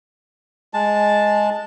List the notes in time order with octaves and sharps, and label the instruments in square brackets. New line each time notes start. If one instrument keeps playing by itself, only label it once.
[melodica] G#3 A5